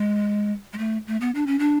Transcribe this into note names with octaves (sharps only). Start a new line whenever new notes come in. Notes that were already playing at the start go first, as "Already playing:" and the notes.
Already playing: G#3
G#3
A3
A3
B3
D4
C#4
D4